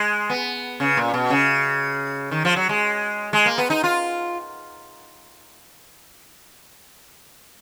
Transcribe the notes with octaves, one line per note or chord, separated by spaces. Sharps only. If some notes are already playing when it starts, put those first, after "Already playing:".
Already playing: G#3
B3
C#3
A#2
B2
C#3
D#3
F3
F#3
G#3
G#3
A#3
B3
D#4
F4